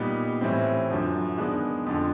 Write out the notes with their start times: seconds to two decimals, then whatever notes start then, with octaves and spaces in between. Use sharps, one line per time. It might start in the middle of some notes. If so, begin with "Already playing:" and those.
Already playing: A#2 G3 B3 D#4
0.41 A2 E3 G3 C4
0.90 F#2 D3 F3
1.38 D#3 G#3 B3 D4
1.86 F2 D3 F3